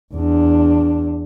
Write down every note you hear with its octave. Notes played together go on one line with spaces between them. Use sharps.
E2 D4